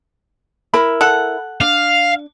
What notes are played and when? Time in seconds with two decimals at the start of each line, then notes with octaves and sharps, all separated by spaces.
0.74 E4 A#4 B5
1.01 A4 F#5
1.61 D4 F5